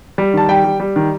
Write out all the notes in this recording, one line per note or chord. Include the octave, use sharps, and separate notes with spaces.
G3
D#3 A5
G3 G5
G3
G3
D#3